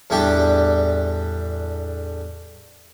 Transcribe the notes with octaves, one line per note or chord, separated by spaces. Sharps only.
E2 A2 G3 D4 G4